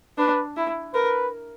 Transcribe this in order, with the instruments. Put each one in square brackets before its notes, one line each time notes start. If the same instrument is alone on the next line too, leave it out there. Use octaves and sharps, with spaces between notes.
[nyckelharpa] D4 [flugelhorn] B4
[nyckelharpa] E4
[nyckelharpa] A#4 [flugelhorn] B4